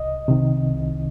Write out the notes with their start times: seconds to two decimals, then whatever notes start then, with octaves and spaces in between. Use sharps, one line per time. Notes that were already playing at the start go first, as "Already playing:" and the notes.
Already playing: C2 D#5
0.28 C3 D#3
0.74 C2